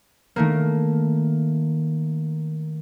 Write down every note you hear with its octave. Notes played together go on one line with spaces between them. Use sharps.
D#3 A3 A#3